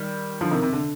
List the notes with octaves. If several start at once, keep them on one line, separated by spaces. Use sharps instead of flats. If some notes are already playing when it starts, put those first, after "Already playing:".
Already playing: D#3 G3
D3 F3
C3 D#3
C3
D3